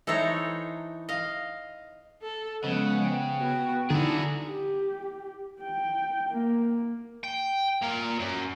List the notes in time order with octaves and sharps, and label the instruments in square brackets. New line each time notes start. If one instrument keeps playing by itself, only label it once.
[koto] E3 D#4 A4 C5 C#5 A#5
D#5 F5
[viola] A4
[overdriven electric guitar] C#3 [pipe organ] F3 G#3 [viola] B3 F#5
[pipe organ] G5
[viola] B3 F#4
[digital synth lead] D3 [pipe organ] D#4 [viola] E4 [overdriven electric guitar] F#4 G#4
[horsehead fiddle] G4
G5
A#3
[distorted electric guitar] G5
A#2 A#4
F#2